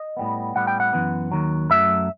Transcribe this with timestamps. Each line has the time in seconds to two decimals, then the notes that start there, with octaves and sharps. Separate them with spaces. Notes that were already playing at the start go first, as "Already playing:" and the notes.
Already playing: D#5
0.17 A2 G3 B3
0.55 A2 G3 B3 F#5
0.67 G5
0.80 F#5
0.93 F#2 E3 B3
1.32 D#2 D#3 F#3
1.70 F#2 F#3 A3 E5